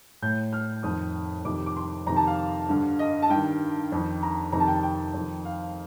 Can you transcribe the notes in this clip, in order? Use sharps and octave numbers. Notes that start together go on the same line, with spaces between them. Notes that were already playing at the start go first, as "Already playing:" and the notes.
A2 G6
F6
F2 D#3 D#6
F2 C3 D#3 D6
D6
C6
F2 C3 D#3 A#5
A5
F5
G2 D3
D#5
A5
G2 D#3 G5
F2 D#3
A#5
F2 C3 D#3 A#5
A5
G5
A5
G5
F2 D#3
F5